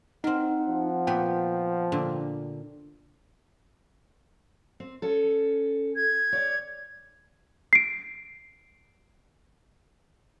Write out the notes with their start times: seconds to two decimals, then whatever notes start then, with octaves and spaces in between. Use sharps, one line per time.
0.24 C4 D#4 A#4 F#5
0.69 F3
1.07 A#2 B3 B4 G5
1.92 A#2 D3
4.80 C4
5.02 C#4 A4
5.96 G#6
6.32 C#5 D5
7.73 C7 D7